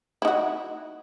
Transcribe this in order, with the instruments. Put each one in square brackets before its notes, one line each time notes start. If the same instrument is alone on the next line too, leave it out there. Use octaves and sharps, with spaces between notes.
[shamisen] E4
D#4
F#4